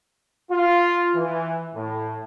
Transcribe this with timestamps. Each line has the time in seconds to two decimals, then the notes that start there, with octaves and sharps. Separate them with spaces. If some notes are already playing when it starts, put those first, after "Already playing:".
0.51 F4
1.15 E3
1.75 A2